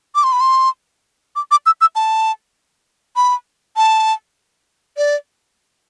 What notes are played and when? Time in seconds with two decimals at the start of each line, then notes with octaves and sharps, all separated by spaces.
0.15 D6
0.24 C6
0.32 B5
0.41 C6
1.36 D6
1.51 D6
1.66 E6
1.81 E6
1.96 A5
3.16 B5
3.77 A5
4.97 D5